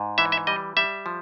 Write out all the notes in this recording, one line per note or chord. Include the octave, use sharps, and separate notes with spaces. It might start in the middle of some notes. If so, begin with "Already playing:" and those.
Already playing: G#2
E3 E5
E5
G3 D#5
G3 E5
F3